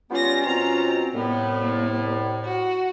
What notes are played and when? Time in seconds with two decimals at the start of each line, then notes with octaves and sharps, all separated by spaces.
0.11 G3 B3 C#4 F4 A#6
0.46 B2 C4 C#4 F4 A#5
1.14 C2 A2 B3
2.43 F#4